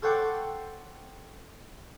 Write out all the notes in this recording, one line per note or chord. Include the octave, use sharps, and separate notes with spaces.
A4 C5 C#5 F#5 G5 D6